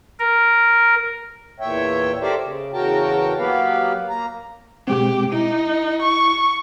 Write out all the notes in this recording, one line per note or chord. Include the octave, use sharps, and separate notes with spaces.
A#4
E2 A#2 C#5 E5 G5
G4 A4 A#4 C5 D5 E5
C#3
E2 C#3 F#4 A#4 G5 A5
F#3 A#3 B3 G4 B4 F5
A#3 A#5
B2 G#3 C4 G4
D#4 E4
C#6